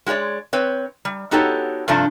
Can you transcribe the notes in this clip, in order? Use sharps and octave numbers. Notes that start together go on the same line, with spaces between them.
G#3 F#4 G4 C#5 D5
C4 B4 C#5
G3
B3 D#4 F#4 G4 A4 C#5
G2 C3 F3 A3 D4